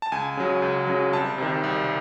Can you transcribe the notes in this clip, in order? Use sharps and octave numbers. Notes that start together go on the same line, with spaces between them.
A5
C#2 G#5
C#3 F#3
C#2
C#3 F#3
C2 A5
C3 D#3
C2